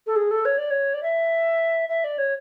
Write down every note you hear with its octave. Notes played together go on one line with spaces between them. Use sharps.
A4
G#4
A4
C#5
D5
C#5
D5
E5
E5
D5
C#5